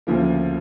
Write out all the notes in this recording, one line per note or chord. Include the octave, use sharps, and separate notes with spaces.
D2 C#3 F3 A#3